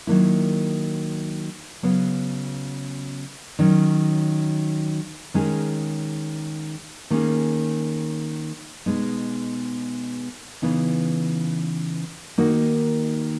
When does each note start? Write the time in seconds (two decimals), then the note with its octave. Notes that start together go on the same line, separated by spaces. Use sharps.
0.07 D#3 F#3 A#3 E4
1.83 C#3 F#3 B3
3.59 D#3 F#3 C#4
5.34 D#3 G#3 C#4 G#4
7.10 D#3 A#3 C#4 G#4
8.86 B2 G#3 B3 D#4
10.62 C#3 E3 B3 D#4
12.38 D#3 A#3 D#4 F#4